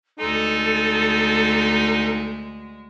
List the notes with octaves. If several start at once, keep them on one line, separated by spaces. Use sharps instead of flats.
D2 G#3 D#4 A4